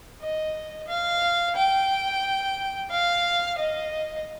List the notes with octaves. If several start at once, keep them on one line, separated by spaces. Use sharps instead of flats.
D#5
F5
G5
F5
D#5